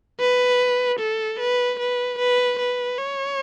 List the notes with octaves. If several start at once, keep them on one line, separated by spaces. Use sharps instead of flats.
B4
A4
B4
B4
B4
B4
C#5